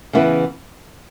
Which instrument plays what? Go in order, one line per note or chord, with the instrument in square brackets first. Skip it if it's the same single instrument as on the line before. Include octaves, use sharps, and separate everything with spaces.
[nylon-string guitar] C#3 E3 B3 E4 B4